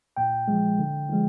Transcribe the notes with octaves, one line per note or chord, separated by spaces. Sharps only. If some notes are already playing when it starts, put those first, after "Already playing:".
A#2 G5
F3 G#3
D3
F3 G#3